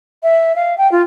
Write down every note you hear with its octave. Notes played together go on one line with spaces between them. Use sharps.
E5
F5
G5
F4